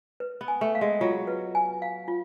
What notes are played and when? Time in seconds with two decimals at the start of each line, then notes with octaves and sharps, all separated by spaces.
0.20 B4
0.41 B3
0.48 G#5
0.61 A3
0.75 F5
0.81 G#3
1.01 F#3 F4
1.27 B4
1.55 G#5
1.82 F5
2.08 F4